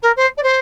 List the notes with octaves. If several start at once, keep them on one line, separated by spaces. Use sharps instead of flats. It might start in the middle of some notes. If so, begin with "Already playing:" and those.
A#4
C5
D5
C5